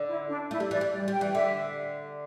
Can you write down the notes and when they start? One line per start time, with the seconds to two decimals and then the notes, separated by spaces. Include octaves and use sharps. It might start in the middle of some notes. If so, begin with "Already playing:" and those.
Already playing: D3
0.08 E4
0.30 D4
0.51 A3 E4
0.60 G3
0.71 E3 D5
0.81 G3
0.93 D5
1.08 G3
1.13 G5
1.21 E3
1.35 D3 E5